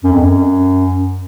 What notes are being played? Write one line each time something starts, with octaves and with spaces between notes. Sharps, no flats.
F#2
F2
F#2